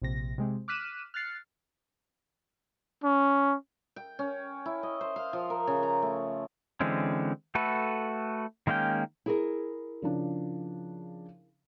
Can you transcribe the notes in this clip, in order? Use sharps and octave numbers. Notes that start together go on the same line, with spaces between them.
A#1 C3 A#6
C3 G#3 C4
D6 F6 F#6 B6 D#7 E7
F6 F#6 A6 C7 C#7
C#4
G5
C#4
E4
D#5
C5
F5
F3
A#4
C#3
A#5
A3
D3 E3 G#3 C4 C#4
A3 F#4 A4 B4
D#3 G#3 A#3 C#4 G5
E4 G#4 A#4
C#3 F3 D4